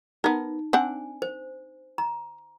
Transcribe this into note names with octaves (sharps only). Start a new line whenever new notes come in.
B3 D#4 A#4
C4 D4 F#5 G#5
C5
A#5